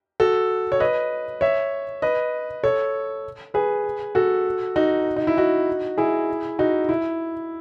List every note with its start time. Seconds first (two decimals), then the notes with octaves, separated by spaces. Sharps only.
0.20 F#4 A4
0.72 C#5
0.80 B4 D#5
1.41 C#5 E5
2.02 B4 D#5
2.63 A4 C#5
3.54 G#4 B4
4.15 F#4 A4
4.76 D#4 F#4
5.16 D#4
5.27 E4
5.37 D#4 F#4
5.98 E4 G#4
6.59 D#4 F#4
6.89 E4